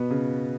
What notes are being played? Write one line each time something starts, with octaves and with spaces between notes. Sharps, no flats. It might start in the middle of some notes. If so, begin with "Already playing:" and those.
Already playing: B2 B3
C#3